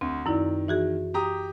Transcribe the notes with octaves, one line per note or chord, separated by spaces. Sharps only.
D2 C4
F#2 D#3 E4 D5
E3 F#4 G#4
G4 A#5 D#6